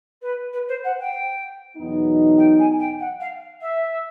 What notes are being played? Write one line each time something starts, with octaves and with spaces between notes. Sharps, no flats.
B4
B4
C5
F#5
G5
E2 B2 F#3 B3 D#4
G5
G#5
G5
F#5
F5
E5